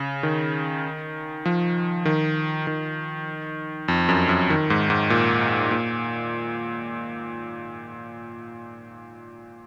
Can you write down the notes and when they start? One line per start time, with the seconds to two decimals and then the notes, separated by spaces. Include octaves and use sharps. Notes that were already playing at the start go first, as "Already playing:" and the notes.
Already playing: C#3
0.23 D#3
1.45 F3
2.05 D#3
2.67 D#3
3.88 F2
4.09 F#2
4.29 F#2
4.50 D#3
4.70 G#2
4.90 G#2
5.10 A#2
5.71 A#2